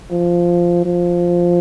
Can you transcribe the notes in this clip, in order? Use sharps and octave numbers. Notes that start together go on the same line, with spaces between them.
F3
F3